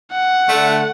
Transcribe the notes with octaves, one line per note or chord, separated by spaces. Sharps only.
F#5
D3 A3